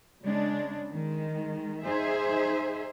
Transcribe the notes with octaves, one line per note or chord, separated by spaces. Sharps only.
C#3 G#3 D4
D#3 G#3
D#4 G#4 C5 E5